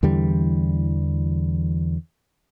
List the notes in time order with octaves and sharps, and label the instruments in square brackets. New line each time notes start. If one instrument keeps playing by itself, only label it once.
[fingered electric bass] E2 D3 E3 G3